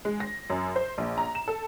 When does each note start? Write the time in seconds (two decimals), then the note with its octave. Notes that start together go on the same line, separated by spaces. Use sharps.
0.05 G#3
0.20 A#6
0.50 F#2
0.76 C5
0.98 A#1
1.18 A#5
1.35 E7
1.48 A4